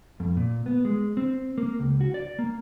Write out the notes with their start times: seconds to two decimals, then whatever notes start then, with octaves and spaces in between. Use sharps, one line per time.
0.20 F2
0.37 A#2
0.66 B3
0.85 G#3
1.17 C4
1.58 A#3
1.79 C#2
2.01 F#4
2.14 D5
2.39 A#3